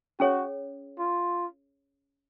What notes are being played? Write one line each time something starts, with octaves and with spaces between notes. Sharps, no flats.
C#4 F#4 G#4 C#5
F4